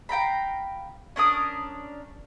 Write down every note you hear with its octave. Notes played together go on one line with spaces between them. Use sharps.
F5 G5 A#5 B5
C#4 D4 A#4 D#6